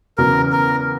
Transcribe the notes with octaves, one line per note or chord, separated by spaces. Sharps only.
E2 C#3 F#3 B3 A#4
A#4